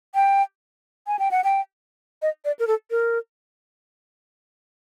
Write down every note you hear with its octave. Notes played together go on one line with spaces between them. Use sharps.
G5
G#5
G5
F#5
G5
D#5
D5
A#4
A4
A#4